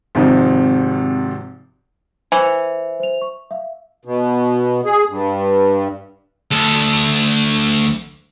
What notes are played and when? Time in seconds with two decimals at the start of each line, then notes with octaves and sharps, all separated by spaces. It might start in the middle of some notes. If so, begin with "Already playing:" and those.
0.15 G#1 C3 F3 D#4
2.32 E3 C5 C#7 F7
3.00 C5 F7
3.22 C#6
3.51 E5 F5
4.05 B2
4.85 G#4
5.09 G2
6.51 D2 A4